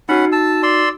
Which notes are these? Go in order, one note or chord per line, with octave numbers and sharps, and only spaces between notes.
C#4 D#4 F#4 F#5 B5
A5 E6
D5 C6 E6